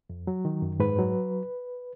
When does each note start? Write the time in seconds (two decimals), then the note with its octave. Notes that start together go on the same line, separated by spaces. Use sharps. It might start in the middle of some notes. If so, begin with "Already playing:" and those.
0.10 F2
0.27 F#3
0.45 D#3
0.62 F#2
0.80 G#2 B4
0.98 F#3